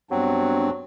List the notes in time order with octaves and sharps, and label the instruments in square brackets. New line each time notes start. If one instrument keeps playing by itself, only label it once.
[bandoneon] G2 C4 [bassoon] F#3 [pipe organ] B3 D4